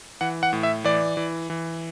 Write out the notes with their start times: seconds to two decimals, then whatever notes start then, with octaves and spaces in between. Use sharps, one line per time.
0.21 E3 F#5
0.43 F#5
0.53 A2
0.63 E5
0.84 E3 D5
1.17 E3
1.50 E3